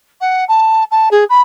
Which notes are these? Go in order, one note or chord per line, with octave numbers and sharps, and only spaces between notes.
F#5
A5
A5
G#4
B5